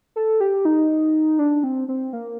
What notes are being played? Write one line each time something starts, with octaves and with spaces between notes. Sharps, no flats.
A4
G4
D#4
D4
C4
C4
A#3